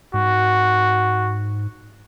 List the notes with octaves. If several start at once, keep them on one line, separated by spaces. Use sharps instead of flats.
G#2 F#4